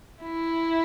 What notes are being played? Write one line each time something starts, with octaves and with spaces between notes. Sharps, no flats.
E4